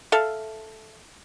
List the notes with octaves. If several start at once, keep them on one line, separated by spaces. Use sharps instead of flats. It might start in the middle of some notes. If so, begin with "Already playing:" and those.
A4 E5 F5